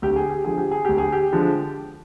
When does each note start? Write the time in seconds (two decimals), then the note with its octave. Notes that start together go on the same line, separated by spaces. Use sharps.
0.02 D2 G4
0.16 G#4
0.30 G4
0.44 D3 F3 G#3 G#4
0.58 G4
0.71 G#4
0.85 D2 G4
0.98 G#4
1.12 G4
1.33 D3 F3 G#3